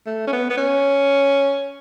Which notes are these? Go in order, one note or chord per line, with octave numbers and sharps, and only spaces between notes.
A3
C#4
B3
B3
C#4